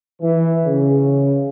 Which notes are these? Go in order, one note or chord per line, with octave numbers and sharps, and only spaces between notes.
E3
C#3